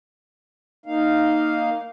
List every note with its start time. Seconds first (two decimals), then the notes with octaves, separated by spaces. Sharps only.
0.86 A#3 D#4 F5